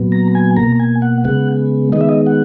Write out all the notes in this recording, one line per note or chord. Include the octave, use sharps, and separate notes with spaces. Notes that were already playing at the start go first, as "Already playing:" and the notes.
Already playing: A#2 F#3 B3
A#5
G#5
B2 A#3 A#5
G#5
F#5
C#3 G#3 B3 F#5
D#3 G#3 B3 D#5
E5
D#5
F#5